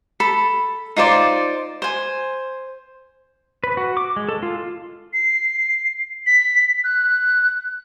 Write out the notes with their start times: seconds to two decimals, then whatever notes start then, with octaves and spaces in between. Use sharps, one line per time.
0.20 A4 B5
0.96 D#4 F4 C5 D5
1.82 C5 G#5
3.64 B4
3.77 F#4
3.97 D6
4.16 G#3
4.29 A4
4.43 F4
5.13 C7
6.27 B6
6.84 F#6